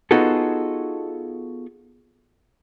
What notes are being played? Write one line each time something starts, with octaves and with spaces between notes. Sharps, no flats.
B3 D#4 F4 F#4 G#4 A4